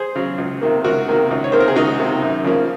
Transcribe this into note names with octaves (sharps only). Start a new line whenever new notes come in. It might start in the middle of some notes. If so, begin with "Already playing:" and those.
Already playing: G#4 C5
C#3 F#3
C#2
C3 D#3 A#3
C#2 F#4 A#4
C3 D#3 A#3
C#2
C#5
C3 D#3 A#3 C5
A#4
G#4
C#2 D#4 F#4
C3 D#3 A#3
F#2
C#3 F3 A#3